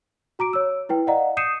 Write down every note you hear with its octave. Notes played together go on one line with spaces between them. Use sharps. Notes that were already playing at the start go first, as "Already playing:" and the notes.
F#4 A#5 D6 D7
C#5 E6
E4 B4 G5
D5 D#5 F5 F#5 A#5
D#6 G6 C7 C#7 D#7 E7